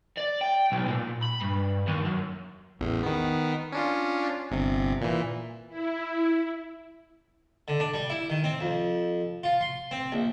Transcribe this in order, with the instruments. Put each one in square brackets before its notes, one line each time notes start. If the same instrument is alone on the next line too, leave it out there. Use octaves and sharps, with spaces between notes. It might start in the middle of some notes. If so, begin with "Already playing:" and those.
[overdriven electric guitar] D5
G5
B1
A#2
B5
G2
D#2
F#2
[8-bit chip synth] A1 E2
D#3 B3
C#4 D4 F4
G1 C3
A#2 E3
[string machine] E4
[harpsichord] D3
D4
G3
E4
D#3
C4
F2
F4
C6
C4
A#1